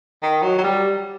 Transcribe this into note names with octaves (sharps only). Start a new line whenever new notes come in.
D#3
F#3
F#3
G3